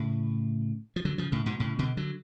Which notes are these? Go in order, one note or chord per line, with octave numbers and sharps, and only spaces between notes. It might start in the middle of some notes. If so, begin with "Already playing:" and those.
Already playing: A2 C#3
F3
D3 F#3
C#3 F3
A2 C#3
G#2 B2
A2 C#3
B2 D3
D3 F#3